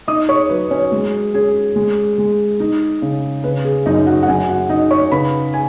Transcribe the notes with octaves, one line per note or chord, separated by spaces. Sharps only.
D#4 D#5 D#6
C#5 C#6
F#3 B4
C#4 C#5
G#3
C#4 G#4
G#3
G#3
D#4
C#3
C#3 B4
G#4
F#2 D#4 D#5
F#4 F#5
F#5
F#2 G#4 G#5
F#4 F#5
D#4 D#5
C#5 C#6
C#3 B4 B5
G#5